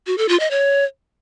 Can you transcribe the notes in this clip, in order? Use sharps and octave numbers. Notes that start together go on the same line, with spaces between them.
F#4
A4
F4
D#5
C#5